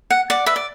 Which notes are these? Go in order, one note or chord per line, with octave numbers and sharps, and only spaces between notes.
F#5
D5 F#5
B4 E5
D5